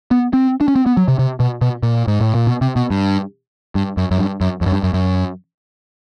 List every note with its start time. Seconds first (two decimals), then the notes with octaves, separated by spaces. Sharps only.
0.11 B3
0.33 C4
0.61 D4
0.68 C#4
0.76 C4
0.86 B3
0.97 F#3
1.08 C3
1.19 C3
1.40 B2
1.62 B2
1.83 A#2
2.07 G#2
2.21 A2
2.35 A#2
2.47 B2
2.61 C3
2.76 B2
2.91 G2
3.75 G2
3.97 F#2
4.11 F#2
4.18 G2
4.41 F#2
4.61 F2
4.66 F#2
4.72 G2
4.83 F#2
4.94 F#2